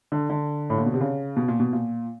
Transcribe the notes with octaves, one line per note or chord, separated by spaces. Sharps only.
D3
D3
A2
A#2
B2
C3
C#3
B2
A#2
B2
A#2